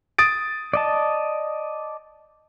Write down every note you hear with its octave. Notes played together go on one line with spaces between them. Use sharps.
D#6 A6 D7
D5 D#5 A5